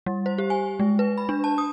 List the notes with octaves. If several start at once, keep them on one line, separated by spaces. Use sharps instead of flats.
G3
C5
G4
G#5
G#3
B4
B5
D4
A5
D#6